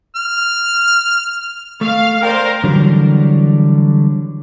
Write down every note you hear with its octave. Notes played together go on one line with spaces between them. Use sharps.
F6
A3 F5
A#4 C5 D5 G5
D3 E3 F#3 G3